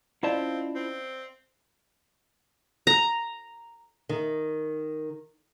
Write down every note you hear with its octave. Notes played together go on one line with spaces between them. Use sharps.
C4 C#4 E4 F4 D5 D#5 F5 A5
C4
A#5
D#3